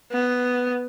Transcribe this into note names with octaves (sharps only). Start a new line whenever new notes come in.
B3